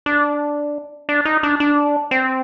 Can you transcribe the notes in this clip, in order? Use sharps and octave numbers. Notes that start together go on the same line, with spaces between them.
D4
D4
D#4
D4
D4
C4